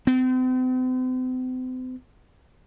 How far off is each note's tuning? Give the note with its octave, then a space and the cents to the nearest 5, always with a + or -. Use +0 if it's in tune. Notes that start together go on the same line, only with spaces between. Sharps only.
C4 -40